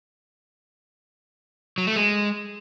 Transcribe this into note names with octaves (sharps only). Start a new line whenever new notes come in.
F#3
A3
G#3